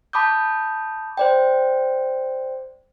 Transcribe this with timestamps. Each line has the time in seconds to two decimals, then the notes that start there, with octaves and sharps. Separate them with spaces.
0.13 A5 B5 D6 D#6 G6
1.17 C5 D5 G5